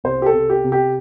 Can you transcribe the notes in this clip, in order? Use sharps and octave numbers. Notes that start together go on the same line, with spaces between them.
C2 C5
G4
A4
C3
G4
C3
G4